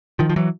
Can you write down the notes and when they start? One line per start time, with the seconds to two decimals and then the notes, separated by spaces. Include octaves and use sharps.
0.19 D#3 F3
0.29 F3
0.36 E3 F#3